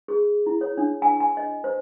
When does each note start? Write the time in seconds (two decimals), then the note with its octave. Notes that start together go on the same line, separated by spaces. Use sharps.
0.08 G#4
0.46 E4
0.61 C#5
0.77 D4
1.02 G#5
1.20 G#5
1.37 D#5
1.64 C5